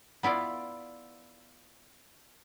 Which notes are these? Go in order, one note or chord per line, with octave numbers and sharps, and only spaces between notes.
B3 E4 F4 D5